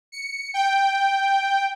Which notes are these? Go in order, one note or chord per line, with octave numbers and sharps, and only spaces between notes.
C#7
G5